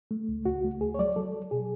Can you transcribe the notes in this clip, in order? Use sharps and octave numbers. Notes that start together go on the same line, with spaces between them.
A3
C#2
C#2 F#4
A3
D2 G#4
C#5
F#3 D5
F#3 A4
F#3
B2 G#4